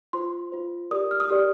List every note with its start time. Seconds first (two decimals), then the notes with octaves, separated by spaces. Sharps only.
0.13 F4 C5 C6
0.52 F4 C5
0.91 G4 A#4 D5 D#6
1.11 F6
1.20 D#6
1.29 G4 A#4 D5 F6